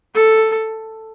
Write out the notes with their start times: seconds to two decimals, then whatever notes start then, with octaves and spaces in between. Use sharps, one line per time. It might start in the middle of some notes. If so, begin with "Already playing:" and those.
0.15 A4